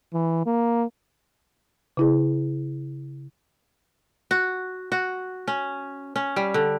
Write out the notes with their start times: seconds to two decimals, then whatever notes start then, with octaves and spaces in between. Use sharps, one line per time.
0.14 E3
0.46 A#3
1.97 C#3 E4 G#4
4.31 F#4
4.92 F#4
5.48 C#4
6.16 C#4
6.36 G3
6.54 D3